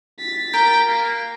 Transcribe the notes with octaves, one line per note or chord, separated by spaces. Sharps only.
A6 B6
A#4 G5
A#3